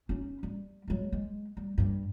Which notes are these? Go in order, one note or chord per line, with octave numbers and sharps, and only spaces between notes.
C#4 D#4
G3
F#3 G#3
G#3
G3
G2 G3